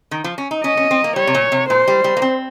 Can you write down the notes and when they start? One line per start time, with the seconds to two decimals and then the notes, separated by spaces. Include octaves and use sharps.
0.11 D#3
0.24 F3
0.38 C#4
0.51 D#4
0.64 C#4 D#5
0.77 C#4
0.91 C4
1.04 A#3
1.16 G3 C#5
1.27 C3
1.35 A#2
1.52 C3
1.69 A#2 C5
1.87 G3
2.04 G3
2.17 A#3
2.22 C4